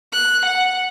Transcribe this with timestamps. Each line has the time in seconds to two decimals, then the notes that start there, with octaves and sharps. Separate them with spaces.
0.13 F#6
0.46 F#5